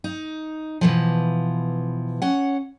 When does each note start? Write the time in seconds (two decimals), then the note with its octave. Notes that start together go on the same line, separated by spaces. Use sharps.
0.04 D#4
0.81 B2 E3 F3
2.22 C#4 F#5